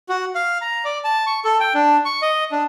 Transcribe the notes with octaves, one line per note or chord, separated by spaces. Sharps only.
F#4
F5
A#5
D5
A5
C#6
A4
G5
D4
C#6
D#5
D4